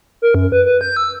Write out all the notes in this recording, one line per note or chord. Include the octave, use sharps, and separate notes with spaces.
A#4
F#2
B4
B4
G6
E6